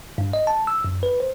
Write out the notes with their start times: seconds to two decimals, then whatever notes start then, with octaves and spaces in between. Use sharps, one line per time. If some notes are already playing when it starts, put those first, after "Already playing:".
0.18 G2
0.33 D#5
0.47 A5
0.67 E6
0.84 F#2
1.03 B4
1.20 C5